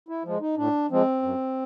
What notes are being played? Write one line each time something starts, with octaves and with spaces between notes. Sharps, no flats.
E4
F3 G#3
D#4
A2 D4
F3 G#3 C4
F#2